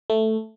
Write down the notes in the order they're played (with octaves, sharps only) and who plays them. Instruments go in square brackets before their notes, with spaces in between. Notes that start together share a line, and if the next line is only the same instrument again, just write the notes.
[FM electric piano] A3